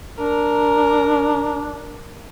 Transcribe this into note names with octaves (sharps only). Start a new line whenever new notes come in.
D4 A#4 A#5